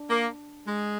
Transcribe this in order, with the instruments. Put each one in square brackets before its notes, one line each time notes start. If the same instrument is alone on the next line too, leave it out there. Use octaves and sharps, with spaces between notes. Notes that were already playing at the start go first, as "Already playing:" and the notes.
Already playing: [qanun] D4
[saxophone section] A#3
G#3